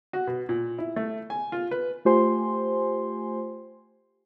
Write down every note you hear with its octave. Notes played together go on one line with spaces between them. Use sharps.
F#4
B2
A#2
E4
A3
G#5
F4
B4
A3 F4 G4 C5 G#5 C6